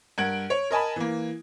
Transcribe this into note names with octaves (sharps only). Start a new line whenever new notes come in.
G2 A#4 F#5 G#6 D7 F#7
C#5
A#4 D#5 G#5 A5 B5
E3 A#3